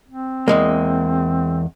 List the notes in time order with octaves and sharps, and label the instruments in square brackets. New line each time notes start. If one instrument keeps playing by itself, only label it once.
[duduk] C4
[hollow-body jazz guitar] E2 G#3 A#3